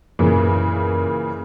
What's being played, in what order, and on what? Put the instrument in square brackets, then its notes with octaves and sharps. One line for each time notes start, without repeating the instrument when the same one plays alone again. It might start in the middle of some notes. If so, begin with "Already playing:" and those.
[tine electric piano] F#2 [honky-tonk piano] A#2 C#3 E3